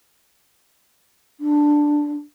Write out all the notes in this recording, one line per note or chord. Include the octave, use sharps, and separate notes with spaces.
D4